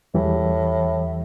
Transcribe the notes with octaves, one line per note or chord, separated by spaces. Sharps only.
E2 A2 E3 G3